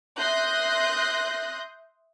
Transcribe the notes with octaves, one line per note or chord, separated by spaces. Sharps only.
E5 C6 D#6 F#6 G6 A#6